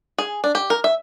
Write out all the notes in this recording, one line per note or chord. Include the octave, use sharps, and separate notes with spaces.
G#4
D4
G4
A#4
E5